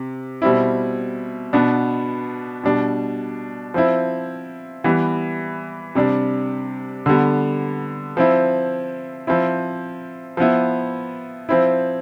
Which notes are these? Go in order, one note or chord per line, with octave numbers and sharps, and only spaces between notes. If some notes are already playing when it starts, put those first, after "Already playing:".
Already playing: C3
B2 G3 C4 E4
B2 B3 D4
B2 G3 D4
F3 C4 E4
E3 G3 B3
C3 G3 D4
D3 G3 B3
F3 C4 E4
F3 C4 E4
F3 B3 E4
F3 C4 E4